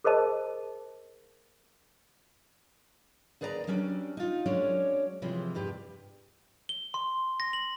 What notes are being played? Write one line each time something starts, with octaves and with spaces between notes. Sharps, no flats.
G#4 A#4 C5 D#5 A5
D#2 G#4 B4 D5 G5 A#5
F#3 G3 C#4 D4
D#4 F4
F#3 G#3 C#4 D4 C#5
C3 E3 F3 G#3
E2 G2 G4 B4
G7
C6
A#6
F#7